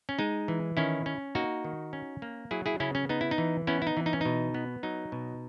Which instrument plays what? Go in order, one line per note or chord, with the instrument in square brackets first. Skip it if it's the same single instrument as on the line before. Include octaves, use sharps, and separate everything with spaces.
[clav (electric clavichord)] C#4
G#3 D#4
E3
D#3 C#4 E4
C#4
A#3 D#4 F#4
D#3
C#4
A#3
F#3 E4 G#4
E4 G#4
C#3 C#4 E4
C#4
B3 D#4
E4
D#4
E3
B3 C#4 E4
E4
D#4
E3
D#4
C#4
B2 D#4
B3
F#3 D#4
B2